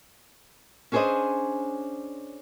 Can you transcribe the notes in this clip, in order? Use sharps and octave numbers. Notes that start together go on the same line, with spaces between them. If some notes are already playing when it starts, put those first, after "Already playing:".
C#4 D4 G#4 A#4 C5 D#5